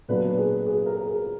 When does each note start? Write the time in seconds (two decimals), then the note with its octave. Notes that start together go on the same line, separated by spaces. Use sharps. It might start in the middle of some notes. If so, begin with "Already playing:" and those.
0.08 A#2 F#3 B3 D4 B4
0.38 G#4
0.66 G#4
0.86 A#4
1.06 G#4